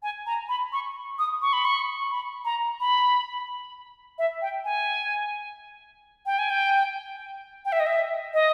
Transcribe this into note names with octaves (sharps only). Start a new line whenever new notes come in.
G#5
A#5
B5
C#6
D#6
C#6
B5
C#6
B5
A#5
B5
E5
G5
G#5
G5
G#5
G5
G5
E5
D#5
E5
D#5